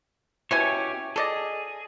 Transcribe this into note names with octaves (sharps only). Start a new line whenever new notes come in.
B2 C#4 E4 G4 C#5 G#5
G#4 A4 D5 D#5